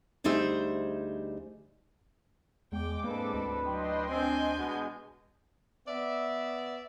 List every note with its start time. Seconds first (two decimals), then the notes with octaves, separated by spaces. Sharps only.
0.24 D2 G3 D#4 G#4 C5 E5
2.72 E2 G#3 G5 D6
3.04 A1 G#2 A#3 C4 D4 A4 B4
3.34 D2
3.64 F#3 D#5 G5 C6
4.10 C4 D4 G#5 G6
4.57 B2 G#3
5.86 B3 D5 E5